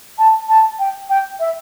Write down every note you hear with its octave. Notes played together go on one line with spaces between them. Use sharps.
A5
A5
G5
G5
E5